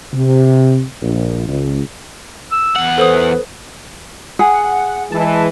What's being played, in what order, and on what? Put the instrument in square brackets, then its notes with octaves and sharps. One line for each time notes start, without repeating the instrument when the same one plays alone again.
[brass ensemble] C3
A#1
C#2
[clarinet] E6
[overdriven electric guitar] E2 F#5
[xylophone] A4 C5 D#6 [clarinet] B4
[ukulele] G#4 [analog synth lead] F#5
[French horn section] E3 G#3 [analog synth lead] A5